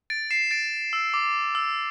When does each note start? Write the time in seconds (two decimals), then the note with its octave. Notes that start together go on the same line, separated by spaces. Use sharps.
0.10 A6 D7
0.31 C7 E7
0.51 A6 D7
0.93 E6
1.14 D6
1.55 E6